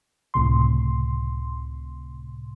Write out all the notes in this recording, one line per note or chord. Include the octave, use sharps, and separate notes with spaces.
C#2 A2 C3 C6